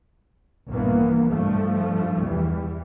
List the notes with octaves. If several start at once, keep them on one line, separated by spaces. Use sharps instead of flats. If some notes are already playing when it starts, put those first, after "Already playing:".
A#1 G2 E3 A#3 B3
G2 F3 A3
E2 E3 G3